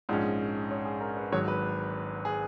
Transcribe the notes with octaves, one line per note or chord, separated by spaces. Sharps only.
A#1 G#2 F3 G#3 C#4
C#5
G#4
A#4
B4
G#1 G#2 F#3 C#5
B4
G#4